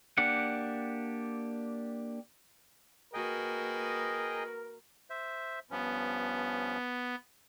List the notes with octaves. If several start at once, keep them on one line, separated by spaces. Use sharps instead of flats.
A#3 D4 G4 F#5
A#3 F#4 G#4 A#4 B4 D#5 G5
C5 E5
G2 F3 B3 C#4